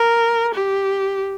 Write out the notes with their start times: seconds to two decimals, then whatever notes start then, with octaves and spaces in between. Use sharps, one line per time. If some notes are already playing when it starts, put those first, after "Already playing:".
Already playing: A#4
0.53 G4